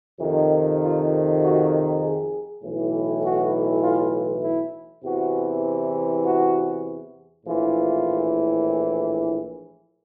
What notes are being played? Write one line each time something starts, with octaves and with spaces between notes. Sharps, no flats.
F2 C3 D#3
F4
F#4
G#4
B1 A2 E3
F#4
F4
E4
E2 C3 E3 F#4
F#4
A#1 A2 E3 F4